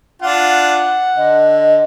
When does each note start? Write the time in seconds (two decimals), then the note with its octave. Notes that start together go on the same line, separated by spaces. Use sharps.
0.22 D4 F4 F#5
1.16 D3 D#5